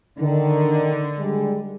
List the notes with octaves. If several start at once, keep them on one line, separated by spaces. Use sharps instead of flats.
D3 D#3
G3 G#3